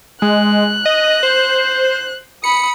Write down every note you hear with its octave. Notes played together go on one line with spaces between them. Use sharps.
G#3 F#6
D#5
C5
B5 D#6 C#7